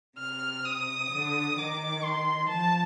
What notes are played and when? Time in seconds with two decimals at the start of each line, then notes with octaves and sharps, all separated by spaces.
0.18 C3 F6
0.65 D#6
1.11 D3
1.57 D#3 D6
2.03 C6
2.49 F3 A5